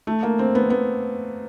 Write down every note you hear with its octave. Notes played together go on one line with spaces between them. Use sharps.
A3
A#3
C4
B3
B3